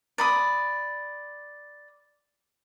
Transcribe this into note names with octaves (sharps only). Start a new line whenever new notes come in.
D5 B5 D#6